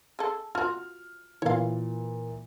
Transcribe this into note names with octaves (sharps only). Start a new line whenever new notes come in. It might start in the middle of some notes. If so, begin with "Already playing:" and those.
G#4 A4
F4 F#4 F6
A#2 E3 C#5 F5